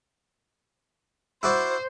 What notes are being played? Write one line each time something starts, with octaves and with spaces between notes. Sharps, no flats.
E4 F#4 C5 D5